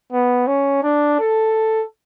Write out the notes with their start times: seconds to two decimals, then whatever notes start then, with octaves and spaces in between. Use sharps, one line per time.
0.12 B3
0.47 C#4
0.83 D4
1.20 A4